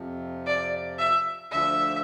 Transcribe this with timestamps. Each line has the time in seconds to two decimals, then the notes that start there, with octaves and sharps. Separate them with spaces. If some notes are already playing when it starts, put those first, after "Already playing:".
Already playing: F2 C3 F3
0.46 D5
0.98 E5
1.51 D2 D3 F3 E5